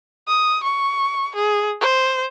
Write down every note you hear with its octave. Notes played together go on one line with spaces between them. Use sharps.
D#6
C#6
G#4
C5